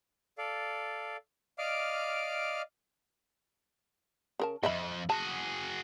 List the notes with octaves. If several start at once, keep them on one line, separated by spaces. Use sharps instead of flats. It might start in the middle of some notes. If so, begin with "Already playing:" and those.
A4 D5 F5
D5 D#5 F5 D6 F6
C#3 A#4 A5
F2 G#2 D#5 E5 B5
F#4 G#4 A5